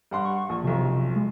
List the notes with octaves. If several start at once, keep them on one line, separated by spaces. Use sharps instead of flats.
G2 F#5 C6
C#6
A#1
B1 F2 C3
G#3